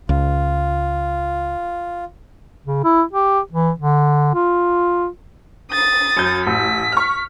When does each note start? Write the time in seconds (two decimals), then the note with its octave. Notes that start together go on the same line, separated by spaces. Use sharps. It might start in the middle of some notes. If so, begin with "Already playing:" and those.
0.09 C#2 F4
2.66 C#3
2.84 E4
3.13 G4
3.52 E3
3.80 D3
4.34 F4
5.71 D#6 A6
6.17 F#2 G6
6.47 A1 B6
6.92 C#6 F6